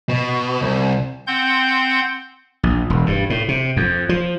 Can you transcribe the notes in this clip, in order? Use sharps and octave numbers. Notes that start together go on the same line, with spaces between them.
B2
C2
C4 F#5 C6 G6
A#1
E1
G2
A2
C3
F2
F3